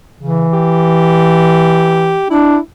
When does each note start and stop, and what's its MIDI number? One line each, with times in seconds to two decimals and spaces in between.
0.20 0.46 49
0.20 2.18 52
0.53 2.28 67
2.30 2.57 62
2.30 2.60 64